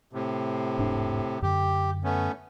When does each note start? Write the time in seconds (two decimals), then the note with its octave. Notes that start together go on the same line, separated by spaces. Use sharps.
0.13 A2 C3
0.78 E1 G#2 D4
1.42 F#2 D3 G4
2.04 A3 B3 C#4